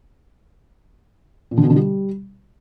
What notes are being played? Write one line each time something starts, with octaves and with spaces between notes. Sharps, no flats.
A#2
D3
B2
D3
G3